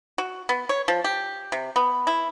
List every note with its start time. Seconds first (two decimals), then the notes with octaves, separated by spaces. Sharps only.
0.18 F#4
0.49 B3
0.69 C#5
0.88 F3
1.04 G4
1.52 C3
1.76 B3
2.07 E4